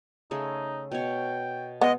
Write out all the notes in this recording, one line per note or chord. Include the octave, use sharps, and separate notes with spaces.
C#3 A3 D#4 G#4
B2 C#5 G5
G#3 B3 D#5